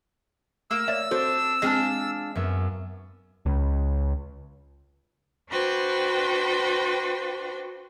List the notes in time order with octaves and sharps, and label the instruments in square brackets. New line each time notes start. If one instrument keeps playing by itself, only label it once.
[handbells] A3 D7 [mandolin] A#3 [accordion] E6
[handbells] C#5 D5 E5
[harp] C4 [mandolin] D4 [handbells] F#4 A4 C5
[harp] G#3 [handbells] C4 D#5 [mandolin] D4 F4 G#4
[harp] F#2 B3 E5
[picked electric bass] C#2
[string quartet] D4 F#4 B4 C5 G5